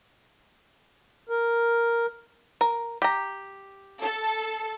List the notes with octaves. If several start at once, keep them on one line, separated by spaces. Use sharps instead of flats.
A#4
A#4
G4 A#5
A4